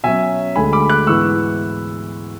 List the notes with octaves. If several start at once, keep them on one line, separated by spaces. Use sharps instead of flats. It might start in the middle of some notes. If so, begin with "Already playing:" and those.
B2 F#3 C#4 E5 G#5
D2 D3 G#3 G#5 B5
B5 D6
D6 F#6
G#2 E3 B3 E4 C#6 E6